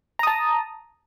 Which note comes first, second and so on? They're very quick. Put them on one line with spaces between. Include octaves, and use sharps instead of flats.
A#5 D#6 A5